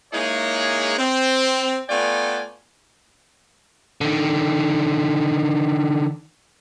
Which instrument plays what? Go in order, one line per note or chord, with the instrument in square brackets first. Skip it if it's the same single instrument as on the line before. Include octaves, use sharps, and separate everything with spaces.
[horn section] G#3 A#3 D#4 E4 G#4 C#5
C4
A3 B3 F4 D5 G5 G#5
[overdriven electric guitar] D3 D#3